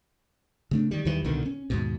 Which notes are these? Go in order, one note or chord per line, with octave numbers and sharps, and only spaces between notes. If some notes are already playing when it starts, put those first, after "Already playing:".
C#3 A3 D4
D#3 G3
D#2 D#3 E3 G3
C2 B2 D3 D#3
C#4
D#2 G#2 B2